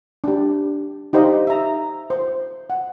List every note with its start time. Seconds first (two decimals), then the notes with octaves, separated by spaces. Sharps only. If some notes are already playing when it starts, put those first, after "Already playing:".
0.24 D4 G4
1.13 D#4 G4 C5 D#5 F5
1.47 E5 A#5
2.10 C5
2.70 F#5